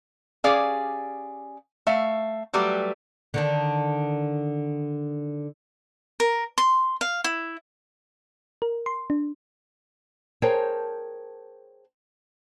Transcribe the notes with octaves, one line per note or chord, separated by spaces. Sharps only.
C#4 G4 G#4 D5 F5
A3 E5 F5
F#3 G3 A3 G4 B4
D3 D#3 D4
A#4
C6
F5
E4
A#4
C6
D4
G#4 A#4 C5 C#5 G5 A5